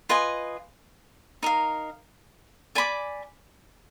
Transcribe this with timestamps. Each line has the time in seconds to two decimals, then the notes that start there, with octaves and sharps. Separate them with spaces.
0.09 F4 B4 D#5 G#5
1.43 D#4 A#4 F5
2.75 D5 G#5 B5 D6